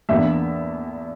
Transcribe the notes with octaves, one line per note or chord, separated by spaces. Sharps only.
E2 E3 A#3 D4 E5